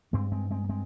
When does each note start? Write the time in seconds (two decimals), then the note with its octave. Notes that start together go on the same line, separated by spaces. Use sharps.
0.13 G2 G#3 C4
0.32 G#3 C4
0.51 G#3 C4
0.64 A#3
0.69 G#3 C4